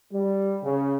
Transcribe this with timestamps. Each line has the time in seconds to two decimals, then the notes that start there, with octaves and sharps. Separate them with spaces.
0.12 G3
0.63 C#3